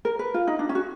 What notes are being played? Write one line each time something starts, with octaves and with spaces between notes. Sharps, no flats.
A#4
B4
F4
D#4
D4
C#4
F#4